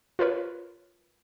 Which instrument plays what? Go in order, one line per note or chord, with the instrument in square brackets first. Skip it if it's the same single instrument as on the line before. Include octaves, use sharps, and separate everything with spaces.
[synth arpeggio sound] F4 A#4 B4 C#5